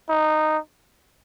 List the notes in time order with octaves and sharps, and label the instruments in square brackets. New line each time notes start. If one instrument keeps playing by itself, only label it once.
[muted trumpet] D#4